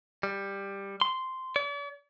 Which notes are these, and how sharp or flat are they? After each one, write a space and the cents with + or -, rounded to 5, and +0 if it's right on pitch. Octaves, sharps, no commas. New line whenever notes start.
G3 +10
C6 -10
D5 -45